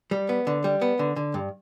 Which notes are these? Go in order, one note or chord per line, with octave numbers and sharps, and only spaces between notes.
G3
B3
D3
G3
B3
D3
D3
G2